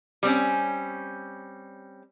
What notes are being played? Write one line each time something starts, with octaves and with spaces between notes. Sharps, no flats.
G3 C4 C#4